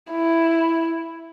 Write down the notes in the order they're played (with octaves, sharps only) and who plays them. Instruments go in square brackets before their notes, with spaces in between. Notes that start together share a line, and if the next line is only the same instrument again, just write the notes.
[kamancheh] E4